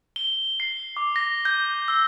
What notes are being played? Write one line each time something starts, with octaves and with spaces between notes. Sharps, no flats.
G7
C7
D6
A#6
G6
E6